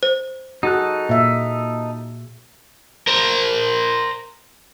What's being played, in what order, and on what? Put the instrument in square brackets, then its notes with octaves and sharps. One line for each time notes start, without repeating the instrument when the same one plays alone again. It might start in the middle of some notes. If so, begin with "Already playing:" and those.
[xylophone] C5
[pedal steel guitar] D#4 A4 F#6 [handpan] F#4 G#4
[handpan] A#2 E5
[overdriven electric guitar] A#4 C5